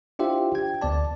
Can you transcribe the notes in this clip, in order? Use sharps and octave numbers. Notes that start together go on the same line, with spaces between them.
D4 E4 F4 G4 C5 E5
G5 G#6
D2 B3 D5 A5